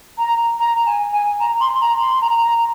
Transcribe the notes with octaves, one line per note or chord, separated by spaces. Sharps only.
A#5
A#5
G#5
G#5
A#5
C6
A#5
C6
A#5
A#5